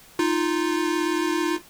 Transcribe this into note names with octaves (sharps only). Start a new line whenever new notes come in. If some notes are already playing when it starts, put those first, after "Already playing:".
D#4 F4